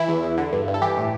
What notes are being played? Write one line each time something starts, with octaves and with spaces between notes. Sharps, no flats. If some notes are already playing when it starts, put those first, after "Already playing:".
Already playing: E3 E4
E2
E2
D3
G2
G2
A4
E3 G4
A2